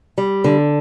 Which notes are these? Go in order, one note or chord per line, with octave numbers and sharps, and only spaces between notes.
G3
D3